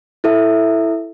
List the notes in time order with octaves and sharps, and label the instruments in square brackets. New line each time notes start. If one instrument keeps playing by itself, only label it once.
[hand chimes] E4 A4 E5